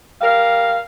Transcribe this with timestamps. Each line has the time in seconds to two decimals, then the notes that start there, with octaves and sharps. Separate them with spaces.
0.22 G3 A#4 F5